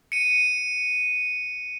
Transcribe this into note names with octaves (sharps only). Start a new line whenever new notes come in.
C#7 D#7